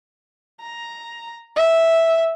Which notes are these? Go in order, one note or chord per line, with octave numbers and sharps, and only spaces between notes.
A#5
E5